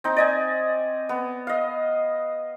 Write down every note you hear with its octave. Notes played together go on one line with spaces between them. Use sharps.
C4 D#4
D5 D#5 G#5
B3
D#5 F5